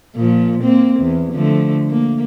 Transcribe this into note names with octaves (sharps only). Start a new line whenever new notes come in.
A#2 F3
A#3 C4
E2
D3 F3 A3
A#3